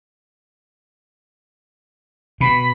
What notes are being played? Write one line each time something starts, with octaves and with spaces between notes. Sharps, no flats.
B2 B5